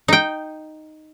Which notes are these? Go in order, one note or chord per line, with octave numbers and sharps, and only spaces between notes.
D#4 G5